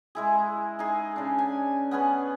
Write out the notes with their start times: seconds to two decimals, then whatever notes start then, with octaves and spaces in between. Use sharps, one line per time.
0.15 G#3 E4 G#4
0.79 D#4 G#4
1.16 C#3 D4
1.38 G#5
1.91 B3 C#4 G#4 B4